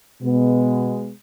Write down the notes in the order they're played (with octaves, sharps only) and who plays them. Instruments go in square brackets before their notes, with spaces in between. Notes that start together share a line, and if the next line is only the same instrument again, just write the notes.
[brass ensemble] B2 G#3 B3